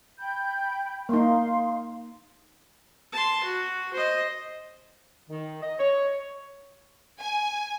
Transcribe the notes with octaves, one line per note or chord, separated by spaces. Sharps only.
G5 B5 G6
A#3 D#4 F5 C6
A5 C6
F#4
C5 D#5
D#3
D#5
C#5
G#5